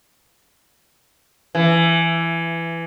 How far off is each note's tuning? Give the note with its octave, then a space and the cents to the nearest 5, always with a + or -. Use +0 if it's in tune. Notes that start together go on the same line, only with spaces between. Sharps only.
E3 +15